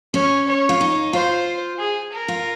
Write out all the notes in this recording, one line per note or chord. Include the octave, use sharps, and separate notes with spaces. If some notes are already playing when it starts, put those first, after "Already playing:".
C#4 C#5
C#5
F4
D#4
F4 C5
G#4
A#4
F4